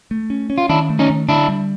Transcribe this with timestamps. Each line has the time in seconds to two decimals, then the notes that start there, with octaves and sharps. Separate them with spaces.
0.11 A3
0.30 C#4
0.50 C#4
0.58 F4
0.69 D#3 D4 E4
0.90 A3
0.99 C#4 D#4
1.10 D#3
1.29 D3 D4 E4
1.48 G3